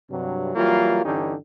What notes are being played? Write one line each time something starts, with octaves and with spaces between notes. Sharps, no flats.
G2 C3 F#3
E3 F#3 G3 A#3 F4
G2 D3 E3 C#4 D#4 G4